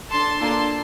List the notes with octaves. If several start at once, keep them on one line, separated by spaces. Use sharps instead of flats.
D4 A4 A5 C6
A#3 D4 F4 A4 A5 C6